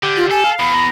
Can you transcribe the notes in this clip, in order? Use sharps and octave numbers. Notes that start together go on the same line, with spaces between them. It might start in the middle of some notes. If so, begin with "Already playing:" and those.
D3 G4
F4
A4 G#5
F5
E2 B5
A#5